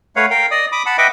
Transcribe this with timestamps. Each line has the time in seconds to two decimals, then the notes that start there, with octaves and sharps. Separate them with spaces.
0.16 A3 B4 C#5 F5 F#5
0.30 A#4 F5 G5
0.51 D5 D#5 D#6
0.72 B5 D6 D#6
0.86 F#5 A5 B5
0.98 B4 D#5 E5 F#5 G5 D6